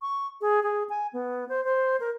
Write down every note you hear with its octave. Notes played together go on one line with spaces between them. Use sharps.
C#6
G#4
G#4
G#5
B3
C5
C5
A#4